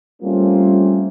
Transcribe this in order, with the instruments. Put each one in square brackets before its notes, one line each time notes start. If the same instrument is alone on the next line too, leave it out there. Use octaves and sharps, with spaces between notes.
[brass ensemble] G3 A3 A#3 C4 C#4 F4